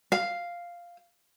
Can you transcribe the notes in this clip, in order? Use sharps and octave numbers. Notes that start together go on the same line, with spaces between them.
F5